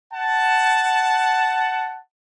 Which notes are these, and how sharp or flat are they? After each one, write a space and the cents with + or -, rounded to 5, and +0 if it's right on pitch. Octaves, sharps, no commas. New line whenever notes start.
F#5 +10 A5 +0